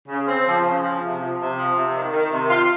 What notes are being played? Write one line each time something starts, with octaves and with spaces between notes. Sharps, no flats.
C#3
C4
F3
C#3
F3
C3
F3
C3
F3
C3
D#3
D#3
C3
F4